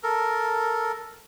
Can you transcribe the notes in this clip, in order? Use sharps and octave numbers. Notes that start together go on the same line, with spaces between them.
A4 A#4